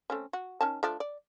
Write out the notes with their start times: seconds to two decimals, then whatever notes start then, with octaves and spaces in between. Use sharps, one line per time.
0.10 A3 C4 C#4
0.33 F#4
0.61 D#3 C#4 A5
0.83 F3 A3 D4
1.00 D5